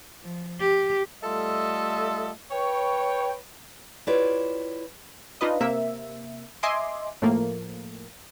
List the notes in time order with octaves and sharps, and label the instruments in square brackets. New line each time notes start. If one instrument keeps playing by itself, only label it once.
[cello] F3
G4
[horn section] G3 A3 F4 A4 D#5 E5
B4 C#5 G5
[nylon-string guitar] E4 F4 G4 B4 C#5 D5
[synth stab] D4 D#4 F4 B4 D#5
C3 A#3 E5
D#5 E5 G#5 C6 D6
A2 F3 A3 A#3